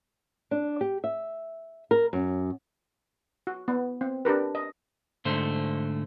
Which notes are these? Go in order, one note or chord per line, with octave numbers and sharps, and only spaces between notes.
D4
G4
E5
A#4
F#2
F#4
B3
C4
D4 G4 A#4 B4
D#5
G#2 D3 A3 C5